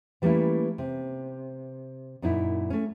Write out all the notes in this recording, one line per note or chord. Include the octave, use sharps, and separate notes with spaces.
E3 G3 A3 A#3 C#4 E4
C3
F#2 A#2 D#4 E4
A3 C#4